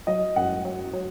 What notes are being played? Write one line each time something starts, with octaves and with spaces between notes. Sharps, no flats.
F#3 D#5
F#2 F#5
F#3
F#3